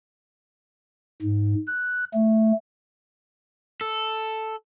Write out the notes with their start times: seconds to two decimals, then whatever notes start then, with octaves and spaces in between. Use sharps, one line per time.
1.22 G#2
1.67 F#6
2.14 A3
3.81 A4